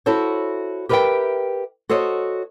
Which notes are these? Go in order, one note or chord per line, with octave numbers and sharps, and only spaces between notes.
E4 F#4 A4 C5 C#5
G4 A#4 B4 D#5 E5 G5
F#4 A4 C5 C#5 D#5